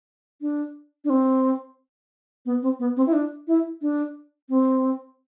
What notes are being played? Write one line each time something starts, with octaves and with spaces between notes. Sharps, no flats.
D4
D4
C4
B3
C4
B3
C4
E4
D4
E4
D4
C4